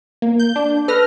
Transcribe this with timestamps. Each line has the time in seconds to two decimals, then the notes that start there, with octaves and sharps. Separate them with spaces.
0.22 A#3
0.40 G6
0.56 D4
0.88 A4 B4 F6 A#6